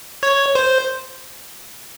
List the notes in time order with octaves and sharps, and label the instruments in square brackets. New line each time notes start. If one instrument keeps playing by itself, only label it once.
[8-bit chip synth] C#5
C5